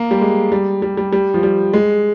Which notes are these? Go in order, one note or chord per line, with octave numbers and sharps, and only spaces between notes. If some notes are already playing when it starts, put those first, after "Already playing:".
Already playing: A#3
G3
G#3
G3
G3
G3
G3
F3
G3
G#3